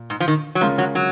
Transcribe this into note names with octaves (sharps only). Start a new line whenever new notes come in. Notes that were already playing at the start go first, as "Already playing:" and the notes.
Already playing: A#2
G#2
F3
D#3
F#3
C#3 F3 G#3 C#4 F4 A#4
F#3
F#3